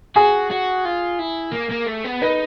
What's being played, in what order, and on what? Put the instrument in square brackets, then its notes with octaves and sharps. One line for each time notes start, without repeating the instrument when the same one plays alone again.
[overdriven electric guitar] F#4 [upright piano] G#4
[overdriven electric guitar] F#4
F4
E4
A#3
A#3
A3
B3
[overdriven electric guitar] D#4 [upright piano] B4